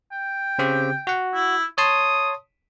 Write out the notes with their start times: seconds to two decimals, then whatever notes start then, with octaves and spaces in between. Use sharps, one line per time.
0.12 G5
0.59 C#3 C4 G4
1.07 F#4 F#5
1.34 E4
1.78 C#5 A5 C6 D#6